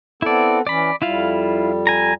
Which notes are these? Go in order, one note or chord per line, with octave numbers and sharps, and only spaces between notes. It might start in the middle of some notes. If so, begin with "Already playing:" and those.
B3 C4 E4 A4 D5
E3 C#4 D5 B5
F2 G3 E4 F4 F5
G#5 A#5